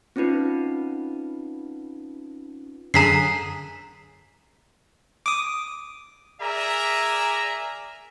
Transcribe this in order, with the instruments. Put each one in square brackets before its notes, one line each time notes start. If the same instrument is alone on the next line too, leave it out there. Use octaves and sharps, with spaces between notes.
[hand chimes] C4 C#4 D#4 F4 B4
[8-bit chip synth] F#2 D3 G#4 [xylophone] A#5 B6 C7
[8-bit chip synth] D6 D#6
[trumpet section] G#4 A#4 D5 E5 G#5 A#5